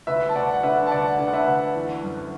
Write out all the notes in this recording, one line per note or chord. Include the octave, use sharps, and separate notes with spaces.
D2 B4 E5
A5
D2 D5 F#5
F#5
D3 B4 E5
A5
D2 D5 F#5
D3
F#5
B4 E5
D2
E3
F#2